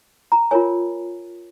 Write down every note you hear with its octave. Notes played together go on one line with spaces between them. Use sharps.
A#5
F4 A#4 C#5 G#5